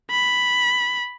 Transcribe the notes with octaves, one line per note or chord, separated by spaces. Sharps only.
B5